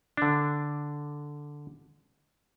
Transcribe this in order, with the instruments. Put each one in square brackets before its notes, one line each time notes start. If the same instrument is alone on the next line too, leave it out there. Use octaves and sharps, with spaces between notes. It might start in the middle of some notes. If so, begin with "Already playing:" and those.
[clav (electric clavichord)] D3 D4